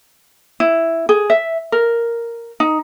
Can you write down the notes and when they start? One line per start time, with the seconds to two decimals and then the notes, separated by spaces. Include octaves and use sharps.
0.60 E4
1.09 G#4
1.30 E5
1.72 A#4
2.60 D#4